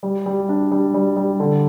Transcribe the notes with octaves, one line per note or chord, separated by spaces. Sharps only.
G3
G3
D4
G3
G3
G3
D3